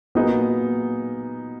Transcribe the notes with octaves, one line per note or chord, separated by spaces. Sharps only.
A#2 F#3 A#3 B3 D#4 G#4